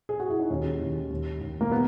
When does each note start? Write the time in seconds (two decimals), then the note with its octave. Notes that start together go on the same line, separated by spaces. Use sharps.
0.09 G#4
0.20 F#4
0.30 E4
0.40 D#4
0.50 D#2 C#4
0.81 D#2
1.11 D#2
1.41 D#2
1.61 A#3
1.72 B3